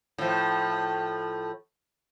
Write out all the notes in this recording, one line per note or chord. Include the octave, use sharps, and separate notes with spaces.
A2 F3